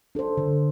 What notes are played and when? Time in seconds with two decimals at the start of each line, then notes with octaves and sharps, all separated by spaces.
0.15 D4 A4 C5
0.37 D3